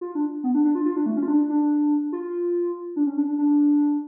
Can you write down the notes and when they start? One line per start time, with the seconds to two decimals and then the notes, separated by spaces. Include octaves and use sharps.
0.01 F4
0.15 D4
0.44 B3
0.54 D4
0.65 D4
0.75 F4
0.85 F4
0.96 D4
1.06 A3
1.17 C#4
1.23 F4
1.28 D4
1.49 D4
2.12 F4
2.96 D4
3.07 C#4
3.18 D4
3.28 D4
3.38 D4